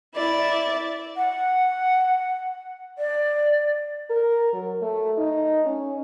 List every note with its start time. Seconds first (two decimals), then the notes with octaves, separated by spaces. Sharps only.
0.15 E4 D5
1.17 F#5
2.98 D5
4.10 A#4
4.53 F#3
4.82 A3
5.18 D#4
5.66 C#4